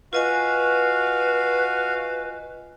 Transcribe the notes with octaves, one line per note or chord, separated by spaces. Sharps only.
F4 F#4 B4 D#5 F5 G#5